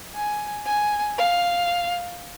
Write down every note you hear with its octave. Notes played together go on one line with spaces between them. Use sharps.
G#5
G#5
F5